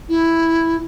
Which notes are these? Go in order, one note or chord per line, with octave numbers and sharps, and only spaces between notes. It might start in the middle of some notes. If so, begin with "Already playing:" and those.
E4